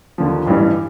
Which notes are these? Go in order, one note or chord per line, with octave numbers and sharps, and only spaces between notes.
D#2 D3 F3
A1 G2 E3 G3